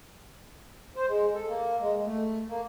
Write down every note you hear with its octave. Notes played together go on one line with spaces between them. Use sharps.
C5
G#3
A4
A#3
G#3
A3
A#3